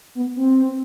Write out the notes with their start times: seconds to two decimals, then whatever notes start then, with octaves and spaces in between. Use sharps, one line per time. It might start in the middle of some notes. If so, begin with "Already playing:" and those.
0.15 B3
0.36 C4